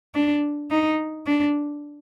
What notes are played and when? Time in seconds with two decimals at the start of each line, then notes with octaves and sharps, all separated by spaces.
0.15 D4
0.71 D#4
1.26 D4